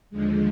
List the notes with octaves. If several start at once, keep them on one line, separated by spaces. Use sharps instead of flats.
D#2 D3 F3 G#3